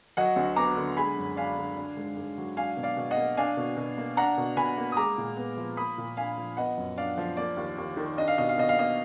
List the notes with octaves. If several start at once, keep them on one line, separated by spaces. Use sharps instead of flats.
F#3 D#5 F#5
D2
B3 A#5 D6
D3
G#3 G#5 B5
F#2
D4 F5 G#5
D3
D4
G#2
G#2
F#3
D4 F5 G#5
B2
D5 F5
B2
D#5 F#5
A#3
D4 F5 G#5
B2
B2
A#3
D4 F#5 A#5
B2
B2 G#5 B5
A#3
D#6
G#3 A#5 D6
A#2
B3
F3
A#3 B5 D#6
A#2
D4 F5 G#5
F3
B3 D#5 F#5
F#2
D4 D5 F5
F3
A#3 D5
D#2
D#2
D#3
D4 D#5
F5
B2 D#5
F5
B2 D#5
F5
A#3 D#5